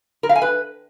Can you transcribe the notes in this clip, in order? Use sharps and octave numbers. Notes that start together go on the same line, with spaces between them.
A#4
F5
G#5
B4